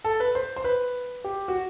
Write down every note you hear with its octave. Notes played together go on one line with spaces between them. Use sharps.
A4
B4
C5
C5
B4
G4
F#4